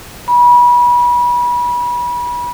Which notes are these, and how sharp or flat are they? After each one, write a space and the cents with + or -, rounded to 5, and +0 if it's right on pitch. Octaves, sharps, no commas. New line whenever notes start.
B5 -30